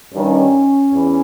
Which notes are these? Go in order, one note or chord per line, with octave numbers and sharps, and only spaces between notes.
G2 D#3 G3 C#4
E2